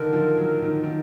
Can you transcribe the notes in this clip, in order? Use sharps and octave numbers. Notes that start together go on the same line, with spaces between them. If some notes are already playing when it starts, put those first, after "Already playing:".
Already playing: D3 D#3 A#4
F3
F#3
D#3
D#3